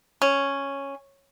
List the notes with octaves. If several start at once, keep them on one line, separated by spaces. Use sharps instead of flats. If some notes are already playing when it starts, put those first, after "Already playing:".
C#4